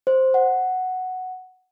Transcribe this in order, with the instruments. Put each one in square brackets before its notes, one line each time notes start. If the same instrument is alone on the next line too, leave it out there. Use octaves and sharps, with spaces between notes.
[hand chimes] C5
F#5